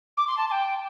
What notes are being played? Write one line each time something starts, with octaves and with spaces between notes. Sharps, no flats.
D6
C6
A5
A5
G5